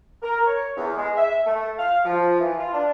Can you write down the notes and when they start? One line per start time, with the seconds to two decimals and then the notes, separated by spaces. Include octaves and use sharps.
0.22 A#4
0.45 C#5
0.76 E2
0.96 G#3
1.16 E5
1.46 A3
1.77 F5
2.04 F3
2.39 E3
2.58 F4
2.72 D4